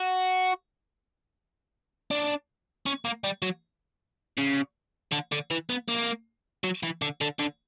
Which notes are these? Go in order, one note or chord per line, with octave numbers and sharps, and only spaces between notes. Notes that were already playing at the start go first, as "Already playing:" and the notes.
Already playing: F#4
D4
C#4
A#3
G3
F#3
C#3
D3
D3
E3
B3
A#3
F#3
E3
D3
D3
D3